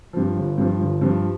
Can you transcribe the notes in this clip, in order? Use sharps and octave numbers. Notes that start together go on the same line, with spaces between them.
G2 F3
G1
G2 F3
G1
G2 F3